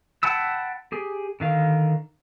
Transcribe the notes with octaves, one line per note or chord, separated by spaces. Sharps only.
F#5 G5 A5 B5 E6
G4 G#4
D3 D#3 F5